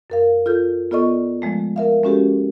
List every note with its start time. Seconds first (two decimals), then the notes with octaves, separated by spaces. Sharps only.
0.10 F#2 A#4 F5
0.46 F4 A4 G6
0.91 B3 F4 A4 D5 D#5 C#6
1.42 F3 G#3 A3
1.76 A#4 E5 F5
2.04 G#3 C#4 F#4 G4 A4